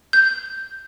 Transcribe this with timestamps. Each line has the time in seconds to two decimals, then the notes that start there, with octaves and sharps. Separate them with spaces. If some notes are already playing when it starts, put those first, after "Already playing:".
0.13 G6